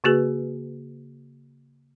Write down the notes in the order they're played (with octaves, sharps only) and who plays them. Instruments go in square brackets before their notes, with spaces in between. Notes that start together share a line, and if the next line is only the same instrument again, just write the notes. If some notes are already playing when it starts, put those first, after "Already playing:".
[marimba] C#3 A#3 F#4 G#4 B4